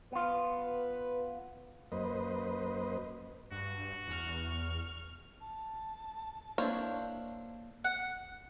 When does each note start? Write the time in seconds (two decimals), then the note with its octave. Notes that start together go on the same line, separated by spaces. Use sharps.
0.12 B3 F4 B4
1.92 F#2 A#3 B4 C5 D#5
3.51 G2 F#4
4.07 E2 C#6 F6
5.41 A5
6.58 A#3 D4 E4 C5 C#5 F5
7.84 F#5